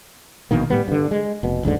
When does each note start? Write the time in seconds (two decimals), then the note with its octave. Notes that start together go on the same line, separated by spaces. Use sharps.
0.51 A#1 B2 D#3 A#3
0.70 A2 G3 B3
0.88 G2 D3
1.11 G#3
1.43 F1 B2
1.63 F#1 D2 G#2 D3